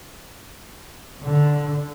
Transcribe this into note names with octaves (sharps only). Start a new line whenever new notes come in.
D3